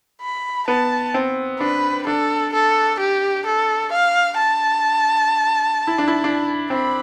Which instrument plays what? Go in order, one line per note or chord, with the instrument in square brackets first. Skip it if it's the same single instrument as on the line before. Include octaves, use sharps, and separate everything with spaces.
[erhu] B5
[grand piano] B3 [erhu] A5
[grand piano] C4
[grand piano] D4 [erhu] B4
[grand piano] D4 [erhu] A4
[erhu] A4
G4
A4
F5
A5
[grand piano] E4
D4
E4
D4
[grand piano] C4 [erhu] B5